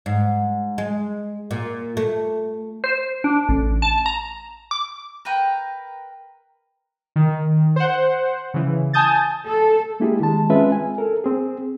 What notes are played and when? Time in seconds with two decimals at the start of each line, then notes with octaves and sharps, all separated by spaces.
0.06 G#2
0.78 G#3
1.51 A#2
1.97 A3
2.84 C5
3.24 D4
3.49 A1
3.82 A5
4.06 A#5
4.71 D6
5.25 A#4 B4 G5 A#5
7.16 D#3
7.76 C5 F#5
8.54 C#3 E3
8.93 G#5 A5 D#6 G6 A6
9.48 A4
10.00 G#3 A#3 D4 E4 G4 G#4
10.20 D#3 G#3 A5
10.50 G#3 C4 C#4 F4 B4 E5
10.72 G#5
10.98 A4 A#4
11.24 C4 G#4